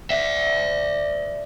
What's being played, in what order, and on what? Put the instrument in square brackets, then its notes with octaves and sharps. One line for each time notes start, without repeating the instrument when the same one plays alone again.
[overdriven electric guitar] D5 E5